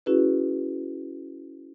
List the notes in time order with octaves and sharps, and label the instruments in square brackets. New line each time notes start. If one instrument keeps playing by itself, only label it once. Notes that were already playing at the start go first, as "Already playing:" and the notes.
[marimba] C#4 E4 F#4 G#4 B4